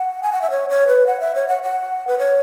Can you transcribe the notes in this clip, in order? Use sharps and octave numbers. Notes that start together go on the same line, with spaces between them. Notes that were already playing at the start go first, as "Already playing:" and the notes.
Already playing: F#5
G#5
F#5
E5
C#5
C#5
B4
F#5
E5
C#5
F#5
F#5
B4
C#5